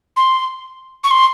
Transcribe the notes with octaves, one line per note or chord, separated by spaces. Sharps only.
C6
C#6
C6